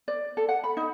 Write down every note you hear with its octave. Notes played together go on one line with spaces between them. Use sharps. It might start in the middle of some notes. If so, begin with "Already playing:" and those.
D5
A4
F#5
B5
D#4